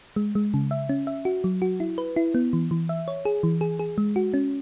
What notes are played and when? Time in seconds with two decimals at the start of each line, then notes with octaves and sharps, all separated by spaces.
0.16 G#3
0.35 G#3
0.54 C#3
0.71 E5
0.89 C#4
1.07 E5
1.25 F#4
1.44 F#3
1.62 F#4
1.80 E4
1.98 B4
2.16 E4
2.35 B3
2.53 E3
2.71 E3
2.89 E5
3.08 C#5
3.25 G#4
3.43 E3
3.61 G#4
3.79 G#4
3.98 G#3
4.16 F#4
4.34 C#4